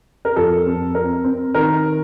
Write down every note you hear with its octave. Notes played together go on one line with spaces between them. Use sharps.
A#4
F2 A4
C4
C4 A#4
C4
D#3 A#4